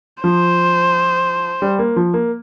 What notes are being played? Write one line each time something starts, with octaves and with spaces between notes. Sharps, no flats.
F3 C5
G3
A#3
F3
A#3